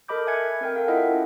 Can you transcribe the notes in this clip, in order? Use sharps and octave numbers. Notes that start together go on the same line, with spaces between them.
A4 A#4 D#5 B5 D6 G6
E5 G#5 F#6 G#6 C#7
C4 A#4 G5
A4 A#4 F5
E4 F4 A4 D#5 E5 F#5
C#4 F4